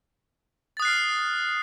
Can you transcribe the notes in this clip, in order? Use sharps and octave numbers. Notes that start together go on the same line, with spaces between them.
D#6 F6 F#6 A6 C7